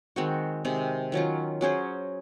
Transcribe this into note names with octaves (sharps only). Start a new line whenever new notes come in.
D#3 G#3 C4 F#4
C3 D#3 G#3
D#3 F#3 C#4 F4
F#3 C#4 G#4 C5